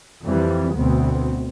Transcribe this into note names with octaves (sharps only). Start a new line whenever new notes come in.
F2 E3 G3
D2 B2 B3 C4